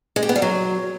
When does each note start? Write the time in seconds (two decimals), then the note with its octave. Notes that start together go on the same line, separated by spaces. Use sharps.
0.16 G#3
0.23 G4
0.29 B3
0.36 G3
0.42 F#3